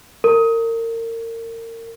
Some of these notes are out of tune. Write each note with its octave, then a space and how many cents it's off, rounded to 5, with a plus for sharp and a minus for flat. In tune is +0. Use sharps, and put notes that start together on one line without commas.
A#4 -30